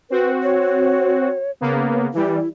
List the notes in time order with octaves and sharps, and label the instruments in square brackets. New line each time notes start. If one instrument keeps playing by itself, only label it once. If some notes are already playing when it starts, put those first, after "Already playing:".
[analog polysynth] C4 F#4 [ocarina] B4
[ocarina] C#5
[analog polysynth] C#3 A#3 B3
[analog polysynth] E3 G3 [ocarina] E4